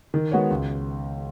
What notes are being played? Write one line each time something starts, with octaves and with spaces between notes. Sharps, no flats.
D#3
G#3 B3 F#4 C#5
C#2